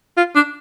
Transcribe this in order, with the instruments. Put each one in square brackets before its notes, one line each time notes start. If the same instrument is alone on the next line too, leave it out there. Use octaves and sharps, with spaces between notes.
[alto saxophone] F4
D4